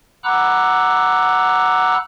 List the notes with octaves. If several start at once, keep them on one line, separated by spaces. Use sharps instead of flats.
F#5 A#5 B5 D6 E6 F#6